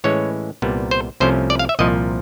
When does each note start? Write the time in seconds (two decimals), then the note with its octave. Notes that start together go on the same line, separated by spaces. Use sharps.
0.04 A2 E3 G#3 C#4 C#5
0.62 C2 A#2 G3 B3
0.91 C5
1.20 C2 C3 F3 A3 C#4 C5
1.50 D5
1.59 F5
1.69 E5
1.79 C2 A#2 F3 D#5